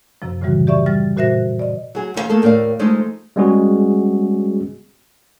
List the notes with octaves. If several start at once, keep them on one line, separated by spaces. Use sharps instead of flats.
F#2 C3 F3
A2 C#3 E3 G3 F#4
G4 D5 E5 C#6
G3 F6 A6
A#2 F#4 C5 E5 F#6 A#6
D5 D#5
F#3 G#4
E2 F4 F5
A3 A#3 G#4 A4
D#2 A2 A#4 D5 F5
F3 G#3 A3 D#4
G3 G#3 B3 C#4 F#4 G#4